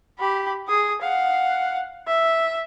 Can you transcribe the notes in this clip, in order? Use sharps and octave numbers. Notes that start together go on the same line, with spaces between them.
G4 B5
G#4 D#6
F5 F#5
E5